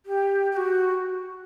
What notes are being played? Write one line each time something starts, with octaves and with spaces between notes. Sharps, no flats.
G4
G4
F#4